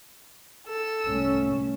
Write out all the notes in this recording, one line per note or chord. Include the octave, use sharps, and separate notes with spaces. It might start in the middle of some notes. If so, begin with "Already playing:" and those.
A4 E6
C2 A3 C#4